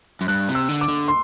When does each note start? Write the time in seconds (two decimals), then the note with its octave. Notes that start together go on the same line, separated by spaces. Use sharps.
0.21 F#2
0.28 G2 F#6
0.49 C3
0.55 E6
0.69 D3
0.81 D6
0.88 D3
1.08 C6